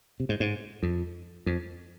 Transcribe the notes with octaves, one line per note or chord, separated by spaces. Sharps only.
C3
G#2
G#2
F2
F2